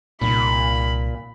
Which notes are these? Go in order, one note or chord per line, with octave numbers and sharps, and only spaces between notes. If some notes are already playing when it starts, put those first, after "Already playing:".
C2 A#2 D#4 B5